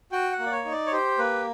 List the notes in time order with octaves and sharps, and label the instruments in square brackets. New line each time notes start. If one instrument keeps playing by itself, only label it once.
[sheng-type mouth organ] F#4 G5
F#5
A#3
D5
C#5
D#4
D5
C#5
G4 C5
A#3 B4